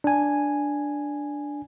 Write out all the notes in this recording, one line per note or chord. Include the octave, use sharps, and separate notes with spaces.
D4 G#5